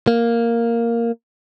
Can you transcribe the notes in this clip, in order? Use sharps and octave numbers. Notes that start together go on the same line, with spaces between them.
A#3